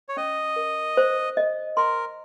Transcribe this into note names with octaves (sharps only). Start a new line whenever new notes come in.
C#5
C#4 D#5
A#4
C5
D#5
A#4 C6